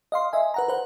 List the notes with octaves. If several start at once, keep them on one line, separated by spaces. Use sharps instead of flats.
D#5 F5 C6
D#5 E5 G#5
B4 F#5 A#5
B4 C5 F#5